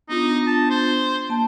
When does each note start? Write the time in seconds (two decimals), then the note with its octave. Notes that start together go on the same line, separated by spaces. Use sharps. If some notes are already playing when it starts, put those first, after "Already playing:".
0.09 B3 D4 D#4 F4
0.47 A5
0.70 C5
1.29 A#3 A5